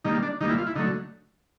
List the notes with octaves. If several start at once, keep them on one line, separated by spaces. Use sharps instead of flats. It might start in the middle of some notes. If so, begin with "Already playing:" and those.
D#3 G3 A#3 D#4
D4
D#3 G3 A#3 D#4
E4
F4
E4
D3 F#3 A3 D#4